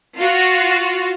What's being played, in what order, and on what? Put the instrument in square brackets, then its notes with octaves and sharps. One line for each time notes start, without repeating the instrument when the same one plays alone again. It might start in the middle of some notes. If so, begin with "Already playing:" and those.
[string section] F4 F#4